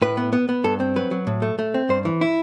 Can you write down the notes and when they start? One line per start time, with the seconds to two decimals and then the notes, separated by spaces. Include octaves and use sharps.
0.02 A2 B4
0.17 B3
0.33 B3
0.49 B3
0.64 G2 A4
0.80 C4
0.96 F#3 B4
1.11 F#3
1.27 A2
1.42 A3
1.59 A3
1.74 C4
1.89 G2 C5
2.05 E3
2.21 E4